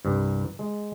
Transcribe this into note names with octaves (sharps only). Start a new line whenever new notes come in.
C2 G2
G#3